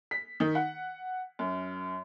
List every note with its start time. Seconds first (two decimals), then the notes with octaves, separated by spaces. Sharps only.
0.11 B6
0.40 D#3
0.55 F#5
1.39 F#2